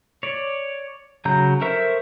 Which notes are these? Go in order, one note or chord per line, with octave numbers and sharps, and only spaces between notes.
C#5 D5
C#3 F#3 A#5 G6
A4 A#4 C5 E5 C#6